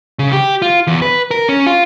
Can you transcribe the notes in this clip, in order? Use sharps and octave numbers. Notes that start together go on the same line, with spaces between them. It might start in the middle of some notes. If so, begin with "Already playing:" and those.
C#3
G4
F4
E2
B4
A#4
C#4
F4